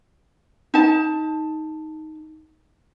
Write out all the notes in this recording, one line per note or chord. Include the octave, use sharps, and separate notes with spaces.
D#4 A5